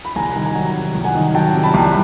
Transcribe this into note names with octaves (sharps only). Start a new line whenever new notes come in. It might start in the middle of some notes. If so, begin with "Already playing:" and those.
B5
C2 G#5 A#5
D#3
G#5 A#5
F#3
C3
C2
F#5 G#5
D#3
F#3 G5 A5
C3
A5 B5
C2